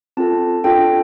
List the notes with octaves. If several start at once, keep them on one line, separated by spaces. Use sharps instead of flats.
C4 F4 A4 A5
D4 F4 A4 G5